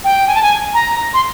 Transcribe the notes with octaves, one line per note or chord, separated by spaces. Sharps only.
G5
G#5
A5
G#5
A#5
C6